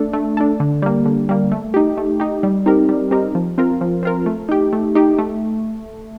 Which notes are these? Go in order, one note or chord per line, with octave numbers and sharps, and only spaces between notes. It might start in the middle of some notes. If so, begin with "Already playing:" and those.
Already playing: A3 D4 A4
A3
D4 A4
D3
G3 A#3
D3
G3 A#3
A3
D#4 G4
A3
D#4 G4
G3
C4 D#4 G4 A#4
G3
C4 D#4 G4 A#4
F3
C4 F4 A#4
F3
C4 F4 A#4
A3
D#4 G4
A3
D#4 G4
A3